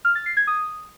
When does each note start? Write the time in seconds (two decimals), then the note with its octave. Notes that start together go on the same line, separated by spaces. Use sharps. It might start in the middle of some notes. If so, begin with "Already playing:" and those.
0.05 F6
0.15 A6
0.26 C7
0.37 G#6
0.47 D#6